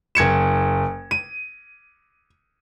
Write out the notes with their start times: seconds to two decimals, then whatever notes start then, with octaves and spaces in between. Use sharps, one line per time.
0.15 F#1 G#6 C#7 E7
1.11 D#7